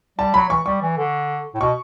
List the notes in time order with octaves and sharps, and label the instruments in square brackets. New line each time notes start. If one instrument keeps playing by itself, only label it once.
[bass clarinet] G3 [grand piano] A5
[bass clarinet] F#3 [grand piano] B5
[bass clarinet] E3 [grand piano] C#6
[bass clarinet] G3 [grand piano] C#6
[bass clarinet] E3
D3
A2
[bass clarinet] B2 [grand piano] C#6